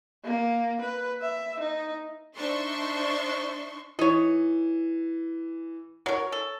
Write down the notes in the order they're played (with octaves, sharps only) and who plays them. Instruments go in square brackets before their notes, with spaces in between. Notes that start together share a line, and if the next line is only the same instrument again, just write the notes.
[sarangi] A#3
B4
E5
D#4
[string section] D4 D#4 C5 E5 C6 C#6
[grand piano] E3 [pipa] D#4 C#5
[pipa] F#3 A#4 [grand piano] C#5
[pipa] A4